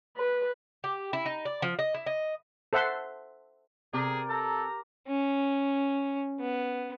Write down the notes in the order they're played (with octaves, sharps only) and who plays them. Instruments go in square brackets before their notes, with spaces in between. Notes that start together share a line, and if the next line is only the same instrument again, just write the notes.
[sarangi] B4
[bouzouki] G4
E4
D#4
D5
F3
D#5
E4
D#5
[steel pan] A4 C5 E5 F#5 A5 C6
[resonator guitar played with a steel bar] C3 [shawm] G#4 [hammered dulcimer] A#4 D5 G5
[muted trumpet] A4 [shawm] A#5
[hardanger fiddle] C#4
B3